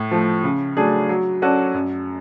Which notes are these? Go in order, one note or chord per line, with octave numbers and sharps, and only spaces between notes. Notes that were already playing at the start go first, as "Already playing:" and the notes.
Already playing: A2
F3 A3
C#3
F#3 A3 D4 G#4
F#3
C#4 F#4 A4 D5
F#2